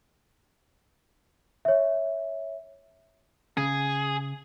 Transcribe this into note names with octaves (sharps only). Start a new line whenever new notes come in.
C#5 E5
C#3 G#4